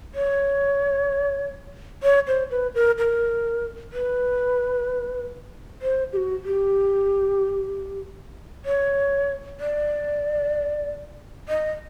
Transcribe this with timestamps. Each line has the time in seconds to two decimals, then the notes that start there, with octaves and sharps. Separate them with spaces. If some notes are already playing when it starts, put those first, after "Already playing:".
0.15 C#5
2.03 C#5
2.27 C5
2.51 B4
2.75 A#4
2.98 A#4
3.92 B4
5.82 C5
6.13 G4
6.17 F#4
6.45 G4
8.65 C#5
9.60 D5
11.49 D#5